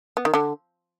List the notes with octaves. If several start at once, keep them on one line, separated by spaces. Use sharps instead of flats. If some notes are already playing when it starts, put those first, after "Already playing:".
B3
D#3
D3